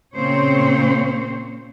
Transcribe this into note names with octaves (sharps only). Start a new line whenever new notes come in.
A#2 C#3 A#3 C4 C5 C#5